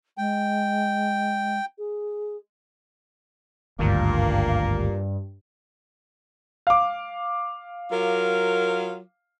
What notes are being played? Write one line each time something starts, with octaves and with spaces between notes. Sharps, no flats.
G#3 G5
G#4
G#1 D2 G2 A#2 A#3
F5 D6
F#3 F4 A#4